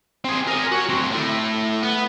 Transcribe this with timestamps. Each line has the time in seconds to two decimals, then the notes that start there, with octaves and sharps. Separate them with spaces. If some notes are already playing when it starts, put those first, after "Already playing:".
0.24 C4 G#4
0.48 A#4 G#5
0.72 F#4 C#5
0.89 D2 C4
1.12 A3 E4
1.83 B3